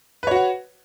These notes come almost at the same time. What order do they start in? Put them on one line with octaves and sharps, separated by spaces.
B4 C#5 F#4 F#5